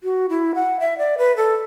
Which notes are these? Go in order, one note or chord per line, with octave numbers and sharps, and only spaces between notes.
F#4
E4
F#5
E5
D5
B4
A4